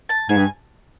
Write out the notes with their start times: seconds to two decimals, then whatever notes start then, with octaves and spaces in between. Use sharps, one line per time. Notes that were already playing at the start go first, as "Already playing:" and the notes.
0.09 A5
0.29 G#2 G#5
0.37 G2